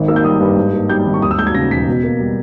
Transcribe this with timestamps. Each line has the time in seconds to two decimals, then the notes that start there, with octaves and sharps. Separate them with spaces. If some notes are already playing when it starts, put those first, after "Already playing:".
Already playing: G#1 D#3
0.08 A#3 E6
0.16 G6
0.24 G3 D#6
0.40 G2
0.56 G#2
0.73 A#3
0.89 G3 G6
1.06 G#1
1.14 C#6
1.22 D#2 D#6
1.31 E6
1.39 G#3 G6
1.47 G#6
1.54 C#3 A#6
1.71 E1 B6
1.88 B2
2.04 A#3
2.20 G3